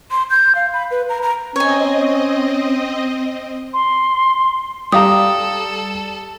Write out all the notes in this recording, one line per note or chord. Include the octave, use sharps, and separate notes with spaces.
C6
G6
F5
B5
B4
A#5
A#5
C4 C#4 C#5 D#5 G#5
C6
G3 G4 A4 F5 A#5 D#6